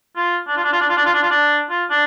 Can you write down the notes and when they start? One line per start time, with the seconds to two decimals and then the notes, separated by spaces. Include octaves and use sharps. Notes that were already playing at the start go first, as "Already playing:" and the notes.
0.16 F4
0.48 D4
0.56 F4
0.64 D4
0.73 F4
0.81 D4
0.89 F4
0.97 D4
1.05 F4
1.14 D4
1.22 F4
1.30 D4
1.70 F4
1.90 D4